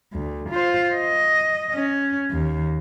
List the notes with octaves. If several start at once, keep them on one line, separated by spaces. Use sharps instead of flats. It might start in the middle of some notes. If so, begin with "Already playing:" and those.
D2
F4 C5
D#5
C#4
D#2